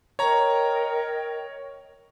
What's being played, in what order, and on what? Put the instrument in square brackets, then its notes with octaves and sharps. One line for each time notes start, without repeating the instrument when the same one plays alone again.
[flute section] A#4 D#5 G5 [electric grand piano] C#5 A#5